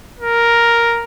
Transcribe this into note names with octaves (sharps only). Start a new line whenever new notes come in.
A#4